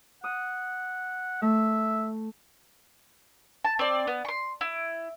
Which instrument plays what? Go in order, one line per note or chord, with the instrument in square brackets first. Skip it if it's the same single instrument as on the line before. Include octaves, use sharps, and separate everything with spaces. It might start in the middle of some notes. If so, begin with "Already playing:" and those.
[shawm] F#5 [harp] D#6
[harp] A3 [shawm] E5
[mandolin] A5
C4 D5
B3
C6 C#6
E4